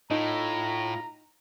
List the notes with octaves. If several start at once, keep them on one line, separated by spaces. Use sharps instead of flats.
A2 D#4 F4 A#5